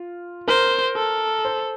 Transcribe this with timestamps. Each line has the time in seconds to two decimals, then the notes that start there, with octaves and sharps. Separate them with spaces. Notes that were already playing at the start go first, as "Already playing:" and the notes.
Already playing: F4
0.48 A#4 C5
0.96 A4
1.45 C5